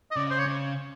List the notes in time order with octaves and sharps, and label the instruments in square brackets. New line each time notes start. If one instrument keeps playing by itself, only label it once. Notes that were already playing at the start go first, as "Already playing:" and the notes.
[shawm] D#5
[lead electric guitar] C#3 [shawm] D5
[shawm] C5
C#5
[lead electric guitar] C#3